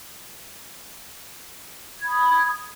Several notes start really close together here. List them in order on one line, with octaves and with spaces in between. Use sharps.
G#6 B5 D#6